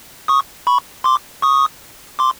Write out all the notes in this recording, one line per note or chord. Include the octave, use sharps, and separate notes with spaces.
C#6 D#6
B5 C#6
C6 D6
C#6 D#6
C6 D6